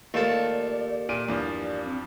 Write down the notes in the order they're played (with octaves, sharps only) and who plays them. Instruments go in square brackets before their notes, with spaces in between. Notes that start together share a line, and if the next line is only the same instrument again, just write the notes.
[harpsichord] D#2 A4 [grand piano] A3 F4 [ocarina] D5
[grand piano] A#2 D7 D#7
E2 G2 F3
[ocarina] D5
C4